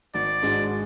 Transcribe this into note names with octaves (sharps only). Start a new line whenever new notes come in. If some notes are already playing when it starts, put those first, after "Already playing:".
G#1 D5
G#2 G#3 D4 F#4